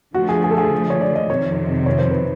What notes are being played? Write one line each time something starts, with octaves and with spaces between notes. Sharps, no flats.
D3 F3 A3 F#4
G#4
G#4
A4
G#4
C#5
D5
D#5
F2 C3 D#3 C#5
C#5
C5
B4